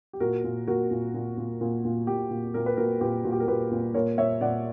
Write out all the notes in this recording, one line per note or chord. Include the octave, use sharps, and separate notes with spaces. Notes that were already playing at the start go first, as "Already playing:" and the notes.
G4
A#2 F#4 A#4
A#2
A#2 F#4 A#4
A#2
A#2
A#2
A#2
A#2
A#2 G4
A#2
A#2 A#4
B4
A#2 F#4 A#4
A#2 G4 B4
A#2 F#4
G4
A#4
A#2 G4 B4
A#2
A#2 A#4 C#5
A#2 C#5 E5
A#2 D5 F#5